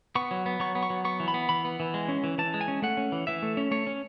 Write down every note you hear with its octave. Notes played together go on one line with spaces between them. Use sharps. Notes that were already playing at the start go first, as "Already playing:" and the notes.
B3 C#6
F#3
B3
F#3 C#6
B3
C#6
F#3
B3 C#6
E3
B5
B3
E3 B5
B3
E3
G#3
C#4
E3
E3 A5
G#3
G#5
C#4
A3 F#5
C#4
E3
E3 E5
A3
C#4
A3 C#5
C#4